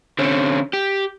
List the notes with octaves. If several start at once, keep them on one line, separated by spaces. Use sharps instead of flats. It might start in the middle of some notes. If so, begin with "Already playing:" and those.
D3 C4 C#4
G4